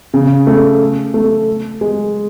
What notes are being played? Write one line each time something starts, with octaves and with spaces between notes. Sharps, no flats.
C#3
A3
A3
G#3